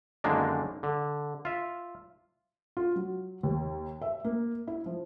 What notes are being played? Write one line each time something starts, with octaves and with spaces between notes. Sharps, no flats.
F#2 D3 D#3 G#3 A#3 D4
D3
F4 E5
F4
F#3
D#2
E5
A#3
E4
F3